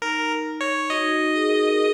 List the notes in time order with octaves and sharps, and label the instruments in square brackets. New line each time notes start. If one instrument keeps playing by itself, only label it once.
[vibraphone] D#4 [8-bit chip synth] A#4
[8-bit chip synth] C#5
[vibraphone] F#4 [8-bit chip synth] D#5
[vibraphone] D#4
F#4
G#4
A#4
G#4
G#4